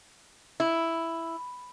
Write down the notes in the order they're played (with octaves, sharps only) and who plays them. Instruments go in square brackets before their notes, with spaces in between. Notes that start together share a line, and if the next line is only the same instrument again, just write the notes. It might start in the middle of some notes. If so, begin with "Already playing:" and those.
[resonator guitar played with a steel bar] E4